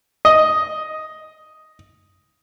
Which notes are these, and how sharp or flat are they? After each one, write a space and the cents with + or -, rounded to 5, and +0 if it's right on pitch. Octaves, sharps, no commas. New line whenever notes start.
D#5 +5